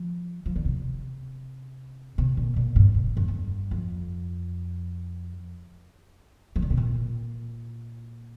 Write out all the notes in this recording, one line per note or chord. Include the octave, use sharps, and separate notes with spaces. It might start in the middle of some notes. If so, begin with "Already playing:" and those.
Already playing: F3
F3
D3
C3
C3
A#2
A#2
G2
A#2
G2
F2
G2
F2
F3
D3
C3
A#2